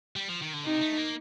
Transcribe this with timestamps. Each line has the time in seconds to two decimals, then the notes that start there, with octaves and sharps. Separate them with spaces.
0.16 G3
0.28 F3
0.41 D#3
0.53 D3
0.65 C3 D#4
0.81 A3
0.97 A#3